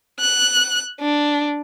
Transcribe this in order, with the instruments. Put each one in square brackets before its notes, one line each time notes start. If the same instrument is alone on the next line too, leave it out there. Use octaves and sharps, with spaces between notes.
[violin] F#6
D4